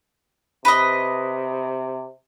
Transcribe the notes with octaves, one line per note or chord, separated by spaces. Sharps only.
C3 B4 D#5